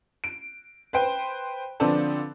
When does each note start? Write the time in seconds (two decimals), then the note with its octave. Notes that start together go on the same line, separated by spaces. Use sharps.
0.24 D7
0.93 B4 C5 G5
1.80 D3 F3 C4 D4 A4 B4